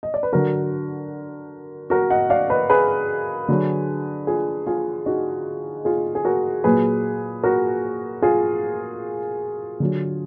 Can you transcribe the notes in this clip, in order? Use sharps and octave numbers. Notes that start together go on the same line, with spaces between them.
D#5
D5
B4
D3 F#3 F#4 A#4
F#4 A#4
D#5 F#5
D5 F5
B4 D#5
G#4 B4
D3 F#3
F4 G#4
F4 G#4
D#4 F#4
F4 G#4
G#4
F#4 A#4
A#2 F#3 G#4 B4
F#4 A#4
F4 G#4
D3 F#3